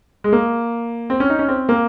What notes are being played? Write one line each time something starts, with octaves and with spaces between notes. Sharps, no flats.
G#3
A#3
C4
C#4
D#4
C#4
C4
A#3